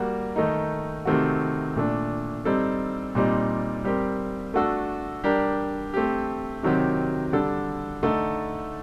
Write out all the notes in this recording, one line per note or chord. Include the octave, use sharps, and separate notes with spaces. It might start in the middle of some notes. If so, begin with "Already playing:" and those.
Already playing: G3 A#3 F#4 A#4
D#3 A3 D#4
C3 D#3 A3 C4 F#4
A#2 A3 D4
G3 C4 D#4 A4
A#2 G3 C4 D#4
G3 C4 G4 A#4
A3 D4 F#4 A4
G3 D4 G4 A#4
A3 C4 G4
C3 D#3 F#3 C4 G4
D3 G3 D4 A4
D3 A3 D#4 A4